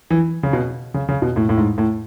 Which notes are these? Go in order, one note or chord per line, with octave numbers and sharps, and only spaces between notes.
E3
C#3
B2
C#3
C#3
B2
A2
A2
G#2
A2